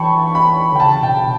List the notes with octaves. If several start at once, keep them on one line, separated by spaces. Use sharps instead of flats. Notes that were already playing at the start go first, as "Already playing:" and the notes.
Already playing: E3 G5 A5 B5 C#6
B5
D3
G5
C#3 A5
B2 G5